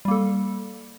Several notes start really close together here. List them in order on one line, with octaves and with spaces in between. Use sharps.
G3 A#3 A4